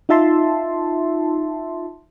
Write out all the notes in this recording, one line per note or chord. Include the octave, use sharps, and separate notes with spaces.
D#4 F4 E5 A5 C6